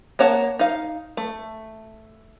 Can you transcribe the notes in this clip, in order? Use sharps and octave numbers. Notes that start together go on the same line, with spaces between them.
A#3 C#5 F#5 A5
D#4 F5
A3